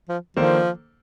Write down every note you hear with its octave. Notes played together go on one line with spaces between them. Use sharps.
F3
D#3 F3 A#3 D4 A4 C5